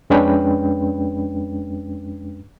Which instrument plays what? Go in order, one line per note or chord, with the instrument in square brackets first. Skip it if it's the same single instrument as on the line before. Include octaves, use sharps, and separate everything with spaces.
[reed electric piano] F2 G#3 C#4 D4 B4 G5